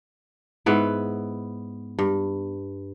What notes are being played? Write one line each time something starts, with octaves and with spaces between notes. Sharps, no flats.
G#2 B3 E4
G2